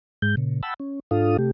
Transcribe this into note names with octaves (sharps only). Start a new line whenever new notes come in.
G#2 G#3 G6
A#2 C#3
F#5 G5 A5 B5 E6
C#4
G#2 D4 F4 A4 F5 D#6
C3 A3 G4